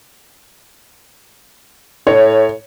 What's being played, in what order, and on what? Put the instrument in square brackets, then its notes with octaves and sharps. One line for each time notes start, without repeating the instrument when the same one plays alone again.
[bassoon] A2 [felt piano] C#5